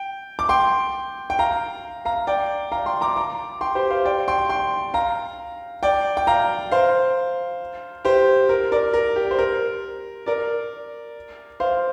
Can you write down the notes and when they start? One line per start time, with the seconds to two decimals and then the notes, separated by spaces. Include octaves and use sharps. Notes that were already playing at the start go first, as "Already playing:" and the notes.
Already playing: G5
0.39 D6
0.49 G5 C6
1.30 G5
1.39 F5 A#5
2.05 F5 A#5
2.27 D5 G5
2.72 F5 A#5
2.86 G5 C6
3.01 A#5 D6
3.16 A#5 D6
3.61 G5 C6
3.75 G4 C5
3.90 C5 F5
4.05 D5 G5
4.28 G5 C6
4.49 G5 C6
4.94 F5 A#5
5.83 D5 G5
6.17 G5
6.27 F5 A#5
6.72 C5 F5
8.05 G4 C5
8.49 A#4
8.72 A#4 D5
8.94 A#4
9.16 G4
9.31 C5
9.39 A#4
10.26 A#4 D5
11.60 C5 F5